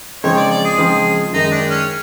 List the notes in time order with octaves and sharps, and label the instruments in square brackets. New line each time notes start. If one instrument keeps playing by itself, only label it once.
[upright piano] C#3 F3 G#3 C4 [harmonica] C#5
[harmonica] D5
D5
G#4
[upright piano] C#3 F3 G#3 C4
[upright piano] F#2 D#3 G#3 [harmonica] D#4
[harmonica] D4
C#4